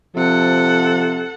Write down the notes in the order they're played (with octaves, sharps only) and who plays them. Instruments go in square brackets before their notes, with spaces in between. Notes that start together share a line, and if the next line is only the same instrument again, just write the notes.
[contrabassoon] C3 [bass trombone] F3 [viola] A4 F#5